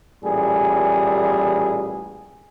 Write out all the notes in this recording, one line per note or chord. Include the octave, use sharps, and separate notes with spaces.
A1 A#2 G3 G#4